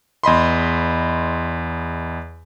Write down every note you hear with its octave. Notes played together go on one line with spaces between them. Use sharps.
E2 D#5 B5 C6